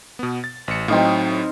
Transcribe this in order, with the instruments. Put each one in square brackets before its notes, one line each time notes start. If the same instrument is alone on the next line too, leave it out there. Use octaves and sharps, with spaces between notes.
[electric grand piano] B2 B3
A6
A1 C#7
[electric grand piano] A2 F#3 [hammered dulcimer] C4 D#4 F5